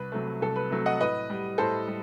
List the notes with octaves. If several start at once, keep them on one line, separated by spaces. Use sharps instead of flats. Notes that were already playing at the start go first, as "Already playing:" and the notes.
Already playing: C2 B4
C3 F#3 A3
C2 A4
B4
C3 F#3 A3
D#5 F#5
A2 B4 D#5
G3
A2 A4 C5
G3